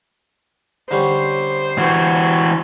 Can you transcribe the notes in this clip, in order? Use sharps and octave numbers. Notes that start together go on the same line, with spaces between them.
D3 G3 C#4 C5
E3 F#4